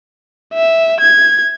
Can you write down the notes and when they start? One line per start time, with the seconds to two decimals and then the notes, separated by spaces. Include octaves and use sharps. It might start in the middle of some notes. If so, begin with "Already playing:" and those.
0.54 E5
1.00 G#6